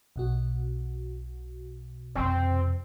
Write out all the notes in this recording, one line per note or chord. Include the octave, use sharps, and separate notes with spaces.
B1 B2 F#4
F2 C3 C4